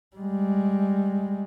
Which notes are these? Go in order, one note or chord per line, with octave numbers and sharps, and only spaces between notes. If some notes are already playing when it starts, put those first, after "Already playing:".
G3 G#3